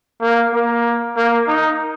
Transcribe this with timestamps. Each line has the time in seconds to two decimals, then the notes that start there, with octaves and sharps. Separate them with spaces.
0.21 A#3
0.53 A#3
1.16 A#3
1.48 D#4